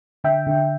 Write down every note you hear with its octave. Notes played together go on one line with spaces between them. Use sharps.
D3 E5 G5
D3